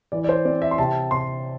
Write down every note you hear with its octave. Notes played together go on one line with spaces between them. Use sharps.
E3 D5
D5
C5
C4 D5
E5
C6
C3 A5
C3 C6